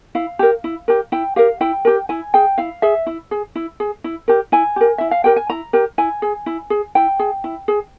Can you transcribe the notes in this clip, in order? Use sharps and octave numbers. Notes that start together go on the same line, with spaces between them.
E4 F5
G4 A#4
E4
G4 A#4
E4 G5
G4 A#4 F5
E4 G5
G4 A#4
E4 G#5
G#4 G5
E4 F5
G#4 E5
E4
G#4
E4
G#4
E4
G4 A#4
E4 G#5
G4 A#4
E4 E5
F5
G4 A#4 G5
G#5
E4 A#5
G4 A#4
E4 G#5
G#4
E4
G#4
E4 G5
G#4
E4
G#4